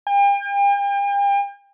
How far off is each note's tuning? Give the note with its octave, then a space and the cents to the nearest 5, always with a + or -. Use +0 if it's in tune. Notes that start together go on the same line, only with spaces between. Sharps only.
G5 +40